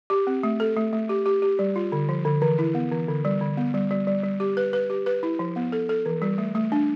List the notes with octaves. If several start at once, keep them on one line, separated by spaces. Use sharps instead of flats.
G4
C4
A3
A4
A3
A3
G4
G4
G4
G3
F4
D3
F3
D3
E3
E4
B3
E3
D3
G3
D3
B3
G3
G3
G3
G3
G4
B4
B4
G4
B4
E4
F3
B3
A4
A4
E3
G3
A3
A3
D4